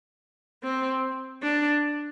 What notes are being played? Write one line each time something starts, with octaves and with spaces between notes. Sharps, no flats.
C4
D4